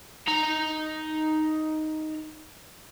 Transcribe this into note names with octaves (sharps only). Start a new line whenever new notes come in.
D#4 A#5